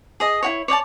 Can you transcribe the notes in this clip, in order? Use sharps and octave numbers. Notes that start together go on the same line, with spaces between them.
G#4 D#5
E4 F#4 C#5
C#5 D5 G5 A5